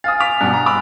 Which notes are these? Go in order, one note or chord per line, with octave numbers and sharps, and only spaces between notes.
F5 G#5 D#6 F6 A6
D6 B6 F7
G2 B2 F#5 F#6
A#5
B5 D6 E6